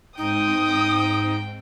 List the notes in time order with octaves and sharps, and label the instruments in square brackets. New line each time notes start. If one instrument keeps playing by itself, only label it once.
[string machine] G#2 C4 [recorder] D#4 [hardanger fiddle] G5 [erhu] D#6